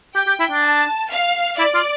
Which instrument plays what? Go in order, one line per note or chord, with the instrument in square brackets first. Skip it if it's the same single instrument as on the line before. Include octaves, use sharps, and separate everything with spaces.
[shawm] G4 [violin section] G5
[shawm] G4
E4
D4
[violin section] A5
F5
[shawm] E4 [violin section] D5
[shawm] F4